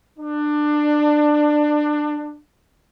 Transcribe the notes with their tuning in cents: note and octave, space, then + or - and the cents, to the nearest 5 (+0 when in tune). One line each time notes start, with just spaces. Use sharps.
D4 +20